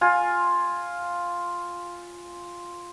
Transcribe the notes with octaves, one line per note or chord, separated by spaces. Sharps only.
F4 G#5